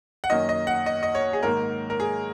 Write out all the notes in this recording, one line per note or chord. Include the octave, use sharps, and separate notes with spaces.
F#5
F#2 D#3 A#3 C#4 D#5
D#5
F#5
D#5
D#5
C#5
G#4
G#2 D#3 A#3 A#4
A#4
G#4